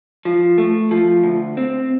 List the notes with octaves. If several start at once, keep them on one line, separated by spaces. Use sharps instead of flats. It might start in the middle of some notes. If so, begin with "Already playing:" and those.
F3
A3
F3
D2
C4